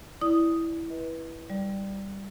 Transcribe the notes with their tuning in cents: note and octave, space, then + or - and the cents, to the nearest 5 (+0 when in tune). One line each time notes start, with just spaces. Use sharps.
E4 +0 D5 +5 D#6 +0
B4 -15 D#5 +45
G3 +0 D5 +0